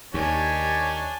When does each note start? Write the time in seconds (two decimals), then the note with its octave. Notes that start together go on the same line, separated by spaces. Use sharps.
0.14 D#2 D#3 D4 G4 C#5 G#5 A5